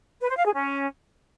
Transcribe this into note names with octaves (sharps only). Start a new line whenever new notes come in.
B4
C5
F5
G#4
C#4